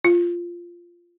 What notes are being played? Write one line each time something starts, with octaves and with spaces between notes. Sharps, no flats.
F4